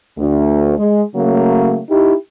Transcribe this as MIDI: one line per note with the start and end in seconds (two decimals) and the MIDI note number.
0.18 0.76 38
0.77 1.01 56
1.16 1.78 49
1.16 1.78 54
1.16 1.78 57
1.16 1.78 58
1.90 2.14 63
1.90 2.14 64
1.90 2.14 67